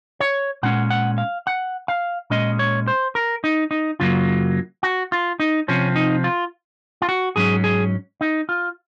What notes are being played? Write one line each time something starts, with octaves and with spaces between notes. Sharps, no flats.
C#5
A#2 G#3 C#4 F#5
F#5
F5
F#5
F5
A#2 G#3 C#4 D#5
C#5
C5
A#4
D#4
D#4
F#2 C#3 F#3 A#3 F4
F#4
F4
D#4
C3 F3 C4 C#4
D#4
F4
F4
F#4
G#2 F#3 C#4 G#4
G#4
D#4
F4